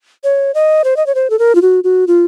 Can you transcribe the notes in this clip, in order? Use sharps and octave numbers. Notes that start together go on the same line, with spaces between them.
C#5
D#5
C5
D#5
C#5
C5
A4
A#4
F4
F#4
F#4
F4